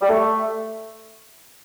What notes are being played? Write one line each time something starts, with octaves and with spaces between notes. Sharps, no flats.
G3
A3